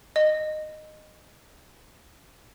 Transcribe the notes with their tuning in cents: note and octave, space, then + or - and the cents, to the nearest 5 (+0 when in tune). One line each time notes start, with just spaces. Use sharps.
D#5 -15